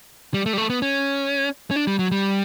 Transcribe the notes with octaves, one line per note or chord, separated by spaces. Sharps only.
G3
A3
G3
A3
B3
C#4
C#4
D4
G3
F#3
G3